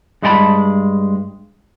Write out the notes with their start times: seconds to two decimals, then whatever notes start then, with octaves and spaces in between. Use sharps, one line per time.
0.22 G2 G#3 D#4 G4 A5 B5